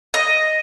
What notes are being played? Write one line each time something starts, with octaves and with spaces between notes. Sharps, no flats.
D#5